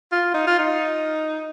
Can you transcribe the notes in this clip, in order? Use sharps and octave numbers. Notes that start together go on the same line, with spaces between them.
F4
D#4
F4
D#4